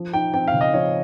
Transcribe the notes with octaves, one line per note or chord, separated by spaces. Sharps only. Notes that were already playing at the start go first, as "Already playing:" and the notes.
Already playing: F3
D#4 G5
C4 G5
F5
C#3
D#5
F3 C#5